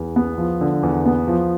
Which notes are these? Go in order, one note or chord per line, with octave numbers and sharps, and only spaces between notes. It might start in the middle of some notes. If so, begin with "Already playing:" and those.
Already playing: E2
B3
F3
D3
E2
B3
F3